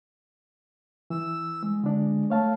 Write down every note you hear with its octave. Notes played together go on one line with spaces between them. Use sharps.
E3 E6
G#3
D3 D4
A3 C#5 F5 A5